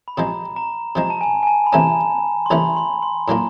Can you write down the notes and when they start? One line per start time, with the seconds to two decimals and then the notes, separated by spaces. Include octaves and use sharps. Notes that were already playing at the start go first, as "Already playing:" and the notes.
0.08 B5
0.17 C3 F3 G#3 A#5
0.56 A#5
0.95 C3 F3 G#3 A#5
1.10 A5
1.21 G#5
1.43 G#5
1.47 A5
1.66 B5
1.73 C2 C3 E3 A3 C#4 A#5
2.46 C6
2.50 C2 C3 E3 A3 C#4 B5
2.77 C6
3.02 C6
3.28 A2 F#3 A#3 D4 F4 A#5